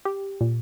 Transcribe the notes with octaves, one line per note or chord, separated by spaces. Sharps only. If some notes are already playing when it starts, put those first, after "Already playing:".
G4
A#2